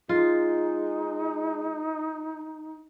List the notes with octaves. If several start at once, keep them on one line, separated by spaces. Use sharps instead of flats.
G#3 D#4 F4